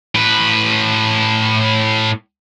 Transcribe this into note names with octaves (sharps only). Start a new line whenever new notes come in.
A2 B4